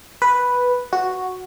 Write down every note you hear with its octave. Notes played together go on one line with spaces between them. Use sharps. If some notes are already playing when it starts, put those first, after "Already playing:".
B4
F#4